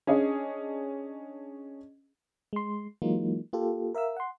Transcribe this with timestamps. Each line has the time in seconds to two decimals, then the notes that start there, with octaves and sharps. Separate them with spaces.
0.07 C#4 D4 G#4 D#5
2.53 G#3 C6
3.02 E3 F#3 G#3 A#3 D#4 F4
3.53 A#3 F4 G4 A4
3.94 A#4 E5 F5 E6
4.17 F#5 C6